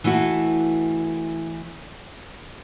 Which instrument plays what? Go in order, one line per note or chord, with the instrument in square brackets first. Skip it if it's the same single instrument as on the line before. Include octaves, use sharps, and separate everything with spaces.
[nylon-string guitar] E3 A3 E4 F#4